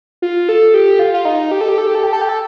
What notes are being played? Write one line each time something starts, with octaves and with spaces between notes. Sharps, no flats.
F4
A4
G4
F4
F4
D#4
G4
A4
G4
A4
G4
A4
G4
A4
G4
A4